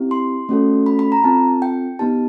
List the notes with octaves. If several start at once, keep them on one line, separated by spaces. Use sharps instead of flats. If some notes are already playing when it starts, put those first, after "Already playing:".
Already playing: C4 E4 G4
C6
A3 C#4 F#4 A4
B5
B5
A#5
C4 F4 A4 A5
G5
B3 D#4 G4 A5